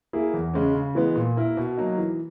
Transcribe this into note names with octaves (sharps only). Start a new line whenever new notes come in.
A#3 E4 G#4
E2
C#3 G#3 C#4
C#3
E3 G#3 B3
A#2
A#3 E4 A#4
B2
F#3 A#3 D#4
E3